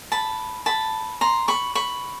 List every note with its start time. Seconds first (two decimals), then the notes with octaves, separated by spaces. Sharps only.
0.12 A5 B5
0.66 A5 B5
1.21 A#5 C6
1.48 B5 C#6
1.75 B5 C#6